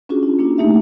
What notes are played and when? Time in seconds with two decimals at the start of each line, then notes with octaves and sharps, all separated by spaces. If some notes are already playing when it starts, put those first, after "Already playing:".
0.09 C#4 D4 F4 F#4 G#4
0.23 E4 F4
0.39 A#3 D4 E4
0.58 A3 A#3 D#4 G4 E5